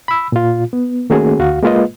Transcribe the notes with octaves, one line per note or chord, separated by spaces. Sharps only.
B5 E6
A#2 F4
B3
D#3 A3 A#3 C#4 F#4 G#4
D2 F#4 F5
G#3 A#3 F4 B4 D#5